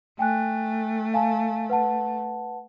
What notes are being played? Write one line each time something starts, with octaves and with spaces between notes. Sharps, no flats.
A3 G5 G#5 F#6
F5 G#5 A5
B4 F#5 A5